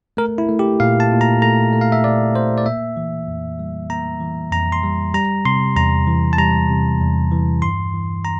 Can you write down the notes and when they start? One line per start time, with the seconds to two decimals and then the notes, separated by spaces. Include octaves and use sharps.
0.17 A3 A#4
0.38 E4
0.49 A3
0.59 G4
0.80 A#2 F5
1.00 A5
1.11 A#2
1.21 A#5
1.42 A3 A#5
1.73 A3
1.81 F5
1.92 E5
2.04 A#2 D5
2.35 A#2 C5
2.58 D5
2.66 A#3 E5
2.97 E3
3.28 F2
3.59 G3
3.90 A#3 A#5
4.21 E3
4.52 F2 A#5
4.72 C6
4.83 G3
5.14 G3 A#5
5.45 C3 C6
5.76 E2 A#5
6.07 E3
6.33 A5
6.38 G3 A#5
6.69 C3
7.00 E2
7.32 E3
7.62 G2 C6
7.93 E3
8.25 A#5